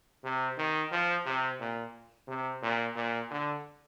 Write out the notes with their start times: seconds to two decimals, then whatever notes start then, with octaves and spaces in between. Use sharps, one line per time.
0.24 C3
0.58 D#3
0.91 F3
1.26 C3
1.60 A#2
2.27 C3
2.62 A#2
2.96 A#2
3.30 D3